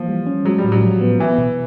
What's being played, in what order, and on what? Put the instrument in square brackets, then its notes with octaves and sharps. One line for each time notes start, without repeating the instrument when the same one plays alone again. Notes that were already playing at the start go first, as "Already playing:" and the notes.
Already playing: [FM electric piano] E3 A#3 [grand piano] F3
[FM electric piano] G3
C#4
[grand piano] F#3 [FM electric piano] G#3
[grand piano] G3
[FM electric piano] A2
[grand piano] F#3
[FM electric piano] F3
B3
[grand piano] E3 [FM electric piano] B3
[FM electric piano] B2